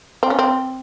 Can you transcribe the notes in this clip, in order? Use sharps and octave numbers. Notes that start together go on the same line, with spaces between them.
C4
C#4
C4